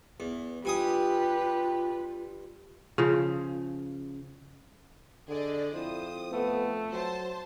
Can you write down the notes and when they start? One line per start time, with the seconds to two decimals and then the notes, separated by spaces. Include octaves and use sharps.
0.20 E2
0.65 G2 F4 G4 B4 G#5 D#6
2.98 C#3 F3
5.28 D3 G#4 D5 D#5
5.74 F2 E4 C5 D#6
6.32 A3 B3
6.91 F#3 C5 A5